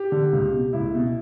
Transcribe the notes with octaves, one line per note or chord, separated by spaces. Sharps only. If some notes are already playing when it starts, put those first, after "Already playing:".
Already playing: G4
D3
C#2
B2
C#2 E4
B2